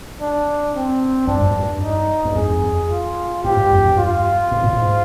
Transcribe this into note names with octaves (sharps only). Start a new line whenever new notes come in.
D4
C4
G2 D4
F2
G2
D#4
G2
F2 G#4
F4
G#2 G4
G2
F2
G2
F4
G#2
A#2
G#2